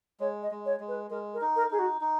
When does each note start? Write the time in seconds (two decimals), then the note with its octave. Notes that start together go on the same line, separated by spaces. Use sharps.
0.20 G#3 C#5
0.43 D#5
0.51 G#3
0.66 C#5
0.80 G#3
0.88 B4
1.11 G#3 A#4
1.34 A#4
1.41 D#4
1.56 A#4
1.70 D#4 G#4
1.79 F#4
2.01 D#4